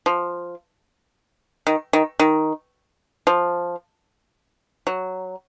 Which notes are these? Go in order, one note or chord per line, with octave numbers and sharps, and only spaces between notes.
F3
D#3
D#3
D#3
F3
F#3